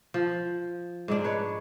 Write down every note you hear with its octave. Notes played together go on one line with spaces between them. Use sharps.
F3
G#2 G#3 D4
B4 C#5